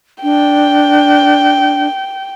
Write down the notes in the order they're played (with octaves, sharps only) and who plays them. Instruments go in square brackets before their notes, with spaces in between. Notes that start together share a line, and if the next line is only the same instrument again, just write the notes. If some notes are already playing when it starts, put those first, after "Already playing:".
[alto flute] D4 [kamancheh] G5